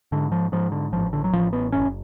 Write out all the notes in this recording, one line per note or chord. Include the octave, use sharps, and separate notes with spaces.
G#2 D3
F3
G#2 F3
D3
A1 F3
D3
F#3
A1 F3
B3
F#1 C#4